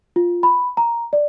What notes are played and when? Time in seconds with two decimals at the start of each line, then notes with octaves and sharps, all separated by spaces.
0.16 F4
0.43 B5
0.77 A#5
1.13 D5